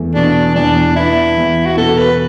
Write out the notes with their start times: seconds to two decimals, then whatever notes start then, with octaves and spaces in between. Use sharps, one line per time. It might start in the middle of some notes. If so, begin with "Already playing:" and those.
Already playing: E2 A3
0.15 B2 D4
0.55 E2 D4
0.96 B3 E4
1.38 E2
1.66 F#4
1.77 B2 A4
1.98 B4